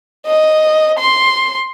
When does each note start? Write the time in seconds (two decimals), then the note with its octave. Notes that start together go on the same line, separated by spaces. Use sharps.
0.26 D#5
0.99 C6